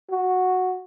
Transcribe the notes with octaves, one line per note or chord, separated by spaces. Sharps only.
F#4